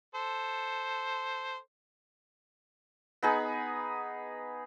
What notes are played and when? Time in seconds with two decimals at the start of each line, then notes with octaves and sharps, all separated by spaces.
0.15 A4 C5
3.23 B3 D#4 G#4